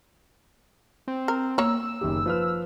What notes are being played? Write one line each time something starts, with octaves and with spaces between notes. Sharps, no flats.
C4
A#4
A#3 C#5 A#5 E6
F#1 D#3 G4
F3 B4 F6